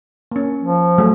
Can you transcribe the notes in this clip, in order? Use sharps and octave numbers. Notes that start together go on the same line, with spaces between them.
A#3 C#4
F3
F#3 A3 G#4